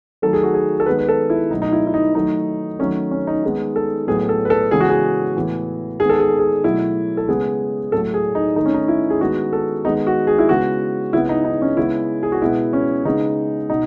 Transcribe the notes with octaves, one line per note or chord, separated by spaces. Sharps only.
D#3 F#3 A3 A4
G#4
F#4
G#4
A4
D#3 G#3 B3 B4
B4
A4
E4
B2 F#3 A3 D#4
D#4
E4
E4
D#4
D#3 F#3 A3 D#4
D#3 F#3 A3 C#4
C#4
D#4
D#3 G#3 B3
A4
A2 F#3 B3 G#4
A4
B4
A4
C#3 E3 G#3 B3 G#4
F#4
G#4
A2 E3 B3
D#3 G#3 B3 G#4
A4
G#4
A4
G#4
B2 F#3 A3 E4
A4
C#3 G#3 B3 G#4
A2 F#3 A3 A4
G#4
D#4
D#3 A3 D#4
C#4
D#4
E4
G#4
D#3 G#3 B3 F#4
A4
D#3 G#3 B3 D#4
F#4
G#4
E4
C#3 G#3 B3 F#4
C#3 G#3 B3 E4
D#4
D#4
C#4
C#3 G#3 B3 E4
G#4
F#4
B2 G#3 B3 E4
C#4
C#3 G#3 B3 D#4
B2 D#4